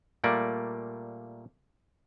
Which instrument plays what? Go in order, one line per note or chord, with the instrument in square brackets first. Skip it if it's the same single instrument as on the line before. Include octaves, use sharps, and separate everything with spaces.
[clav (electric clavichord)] A#2 G3 A3 A#3 D5